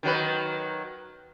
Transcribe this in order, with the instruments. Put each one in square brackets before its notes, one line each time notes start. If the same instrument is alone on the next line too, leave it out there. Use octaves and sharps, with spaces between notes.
[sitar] D#3 F#3 B4